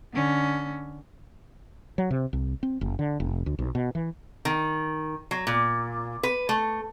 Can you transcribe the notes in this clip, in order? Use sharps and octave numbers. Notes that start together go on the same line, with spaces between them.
D3 C#4
F#3
C3
C2
C4
F#1
D3
F1
D2
B1
B2
E3
D#3
F#3
A#2
B4
A3